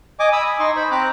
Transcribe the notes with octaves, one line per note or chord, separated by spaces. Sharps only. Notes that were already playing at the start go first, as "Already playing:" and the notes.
D#5 G#5 D6
B5 D#6 E6
G#5
D#4 D#5 C6 C#6
C5 B5
C4 A#5 D6 F#6